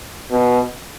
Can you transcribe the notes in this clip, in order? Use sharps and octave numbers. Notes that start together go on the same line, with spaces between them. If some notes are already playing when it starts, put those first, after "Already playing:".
B2